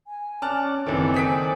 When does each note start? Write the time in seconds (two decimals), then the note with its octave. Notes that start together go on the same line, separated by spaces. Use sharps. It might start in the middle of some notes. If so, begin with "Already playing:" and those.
0.07 G#5
0.42 C#4 D5 A5 F6 F#6
0.87 F#1 D#3 E3 C4 A4 D5 G#5
1.14 C4 D#6 B6 D7